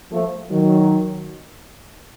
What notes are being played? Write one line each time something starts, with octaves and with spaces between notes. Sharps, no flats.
F3 A3
D#3 F#3